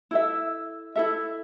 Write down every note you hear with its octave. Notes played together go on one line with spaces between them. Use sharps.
E4 A4 E5
E4 A4 E5